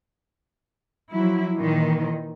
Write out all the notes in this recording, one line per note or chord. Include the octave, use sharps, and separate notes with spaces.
F3 F#3 E4
A#2 D#3 E3 D#4